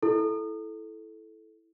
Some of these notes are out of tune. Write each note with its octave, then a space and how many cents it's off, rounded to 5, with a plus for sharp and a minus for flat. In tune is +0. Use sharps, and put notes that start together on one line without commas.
E4 +0 A4 -15